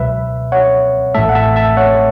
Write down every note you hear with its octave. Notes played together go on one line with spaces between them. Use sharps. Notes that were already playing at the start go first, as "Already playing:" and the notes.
Already playing: C#2 B2 F#3 B4 E5
C#5 F#5
A1 A2 A3 E5 A5
F#5
E5 A5
E5 A5
C#5 F#5